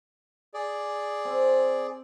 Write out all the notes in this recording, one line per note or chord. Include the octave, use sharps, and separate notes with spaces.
G#4 D5
C4 C5